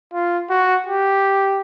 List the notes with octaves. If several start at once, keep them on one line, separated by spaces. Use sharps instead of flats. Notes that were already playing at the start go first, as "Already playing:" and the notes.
F4
F#4
G4